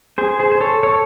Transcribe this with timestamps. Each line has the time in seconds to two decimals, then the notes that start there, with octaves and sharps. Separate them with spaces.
0.18 G#4 C5
0.39 G#4 C5
0.52 C5
0.61 A4 C#5
0.83 A4 C#5